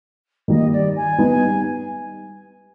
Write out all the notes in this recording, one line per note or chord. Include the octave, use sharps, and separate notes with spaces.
D#3 G3 A#3 D#5
D5
G#5
G3 B3 D#4